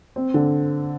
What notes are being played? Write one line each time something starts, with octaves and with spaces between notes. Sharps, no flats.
C4
D3